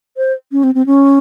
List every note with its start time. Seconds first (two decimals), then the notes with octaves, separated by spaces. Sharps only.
0.17 C5
0.52 C#4
0.63 C4
0.75 C4
0.86 C#4